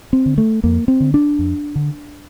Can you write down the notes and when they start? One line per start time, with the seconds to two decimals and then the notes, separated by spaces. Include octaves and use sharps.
0.13 C4
0.26 D3
0.38 A3
0.64 F2 A#3
0.88 C4
1.00 D3
1.14 D4
1.39 F2
1.76 D3